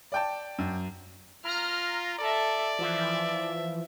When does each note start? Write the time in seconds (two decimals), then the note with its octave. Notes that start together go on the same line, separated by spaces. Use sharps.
0.12 D5 G5 A5
0.58 F#2
1.45 F4 A#5 F6
2.19 A4 D5 E5
2.79 E3 F3 E5